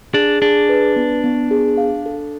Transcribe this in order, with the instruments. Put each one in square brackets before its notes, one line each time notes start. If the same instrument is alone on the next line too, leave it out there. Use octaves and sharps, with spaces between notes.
[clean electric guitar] D4 [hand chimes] G#4
[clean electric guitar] D4 [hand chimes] G#4
[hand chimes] B4
B3
B3
G#4
F5
A4